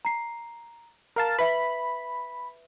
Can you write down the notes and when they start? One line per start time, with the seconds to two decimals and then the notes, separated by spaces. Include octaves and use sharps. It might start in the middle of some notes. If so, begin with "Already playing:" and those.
0.05 A#5 C7
1.16 A#4 F5 A5
1.39 B4 E5 B5